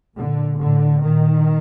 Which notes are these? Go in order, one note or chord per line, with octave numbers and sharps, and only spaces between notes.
A#2 D3
A2 D3
A#2 D#3